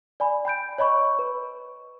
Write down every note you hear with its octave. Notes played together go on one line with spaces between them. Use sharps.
D5 G#5 B5
G5 B5 G6 D7
C#5 D#5 B5 C#6
B4